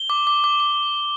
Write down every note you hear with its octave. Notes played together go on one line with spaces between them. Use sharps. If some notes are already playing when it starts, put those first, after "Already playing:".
Already playing: G7
D6
D6
D6
D6